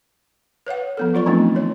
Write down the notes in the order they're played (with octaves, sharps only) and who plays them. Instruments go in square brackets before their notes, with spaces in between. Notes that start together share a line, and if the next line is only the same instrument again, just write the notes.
[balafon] B4 C#5 F5 F#5
F3 B3 A4
F#3 F4 D5 C#6
E3 F3 A3 C4 D4 D#4
D#3 C#5